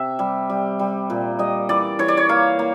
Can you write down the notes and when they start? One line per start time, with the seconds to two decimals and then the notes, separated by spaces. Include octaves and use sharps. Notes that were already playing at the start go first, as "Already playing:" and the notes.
Already playing: C3 E5
0.19 G3
0.49 G3
0.79 G3
1.10 A#2
1.39 G3 D#5
1.69 E3 D5
1.99 E3 C#5
2.08 D5
2.17 C#5
2.29 A#3 F5
2.59 A#3